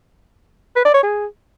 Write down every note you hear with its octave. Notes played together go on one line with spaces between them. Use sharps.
B4
D5
C#5
G#4